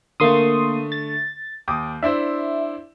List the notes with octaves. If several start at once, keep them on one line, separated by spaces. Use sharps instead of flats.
D3 A3 A#3 C6 D#6
A6
D#2 G5 D6 D#6
D4 E4 C5 E5